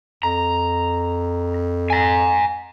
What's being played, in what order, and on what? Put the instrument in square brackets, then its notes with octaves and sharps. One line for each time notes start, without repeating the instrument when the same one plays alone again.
[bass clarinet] F2 [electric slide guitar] A#5
[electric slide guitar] G#5 A#5